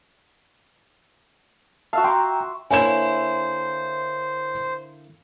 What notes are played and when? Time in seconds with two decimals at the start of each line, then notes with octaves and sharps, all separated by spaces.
1.93 F#4 E5 F5 A5
2.04 G5 A#5 C6 D6
2.71 D3 A#3 E4 C5 C#5 G#5 E7